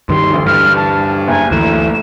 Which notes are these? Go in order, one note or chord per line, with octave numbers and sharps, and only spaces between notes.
G2 D#3 G3 C6
A1 D2
G2 F6
A5
F#1 G#5
D2 E3 A3 E7